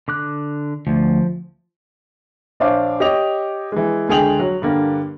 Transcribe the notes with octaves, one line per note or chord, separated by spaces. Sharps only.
D3 D6 F#6
D2 F3
A#1 D4 C5 C#5 F5 D6
G4 C#5 D#5 D6 F7
E3 G#3
C#2 D3 G#4 G5 F7 F#7
F#3
G2 D3 A#3